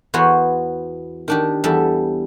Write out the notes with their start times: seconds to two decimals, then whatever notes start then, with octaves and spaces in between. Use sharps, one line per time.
0.14 E2 B3 F#4 C5 C#5
1.28 D#3 D4 G4
1.64 E2 G3 A4 E5